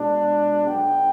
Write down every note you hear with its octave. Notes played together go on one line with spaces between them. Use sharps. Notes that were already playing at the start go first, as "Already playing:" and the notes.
Already playing: B2 G#3 D4
B1 B2 B3 D4 G5